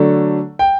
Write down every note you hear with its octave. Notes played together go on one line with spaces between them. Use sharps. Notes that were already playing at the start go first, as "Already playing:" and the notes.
Already playing: D3 F#3 A3 D4
G5